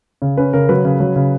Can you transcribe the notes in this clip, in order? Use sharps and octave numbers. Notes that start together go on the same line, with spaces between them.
C#3
C#4 B4
C#3 A#4
F#3 B4
C#3
F#3
C#3